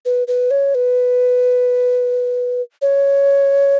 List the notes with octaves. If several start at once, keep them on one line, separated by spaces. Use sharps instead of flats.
B4
B4
C#5
B4
C#5